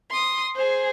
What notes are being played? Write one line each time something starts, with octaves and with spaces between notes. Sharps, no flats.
C6 D#6
G#4 C5